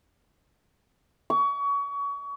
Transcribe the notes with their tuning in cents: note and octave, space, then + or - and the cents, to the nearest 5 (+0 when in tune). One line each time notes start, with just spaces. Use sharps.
C#6 +30